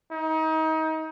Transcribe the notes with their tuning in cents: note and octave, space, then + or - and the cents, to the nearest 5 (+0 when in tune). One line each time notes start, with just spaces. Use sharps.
D#4 +30